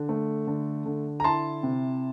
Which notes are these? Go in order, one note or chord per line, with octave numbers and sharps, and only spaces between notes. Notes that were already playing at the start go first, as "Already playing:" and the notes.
Already playing: D3
A3
D3
D3
A#5
E4 A5 C6
C3